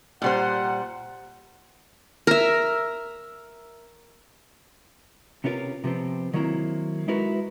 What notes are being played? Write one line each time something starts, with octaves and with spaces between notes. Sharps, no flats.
A#2 G3 C5 F#5
A#4 E5
C3 B3 C#4 F4 A#4
C3 F3 B3 C4
D#3 F#3 A#3 C4 E4
G#3 D#4 E4 F#4 A#4 B4